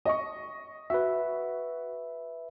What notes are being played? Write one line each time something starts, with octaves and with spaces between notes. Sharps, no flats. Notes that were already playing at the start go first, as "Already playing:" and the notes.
D#5 C#6
F#4 B4 E5